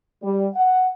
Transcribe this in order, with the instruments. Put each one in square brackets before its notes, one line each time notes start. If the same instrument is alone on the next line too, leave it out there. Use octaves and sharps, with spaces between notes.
[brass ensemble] G3
F#5